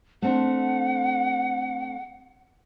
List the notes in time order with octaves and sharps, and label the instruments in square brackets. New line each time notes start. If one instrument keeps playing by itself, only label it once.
[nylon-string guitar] A3 C4 D4 [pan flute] F#5